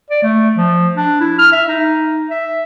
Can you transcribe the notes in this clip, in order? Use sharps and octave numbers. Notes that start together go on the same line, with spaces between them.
D5
A3
F3
D4
E4
F6
E5
D#4
E5